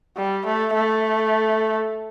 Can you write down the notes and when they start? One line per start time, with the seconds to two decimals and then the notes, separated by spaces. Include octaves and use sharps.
0.17 G3
0.46 A3
0.74 A3